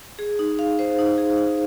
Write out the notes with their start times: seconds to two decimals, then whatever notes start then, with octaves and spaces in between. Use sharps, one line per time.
0.19 G#4
0.39 D#4
0.59 F5
0.79 C5
0.99 D#4
1.18 G#4
1.38 D#4